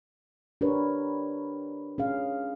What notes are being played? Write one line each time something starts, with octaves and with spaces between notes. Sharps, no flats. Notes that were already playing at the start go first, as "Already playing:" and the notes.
D4 G4 A#4 B4 C#5
C#4 G#4 F5